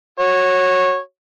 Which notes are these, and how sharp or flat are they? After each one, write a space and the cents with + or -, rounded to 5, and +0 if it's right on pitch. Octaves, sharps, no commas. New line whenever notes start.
F#4 +0 C#5 -15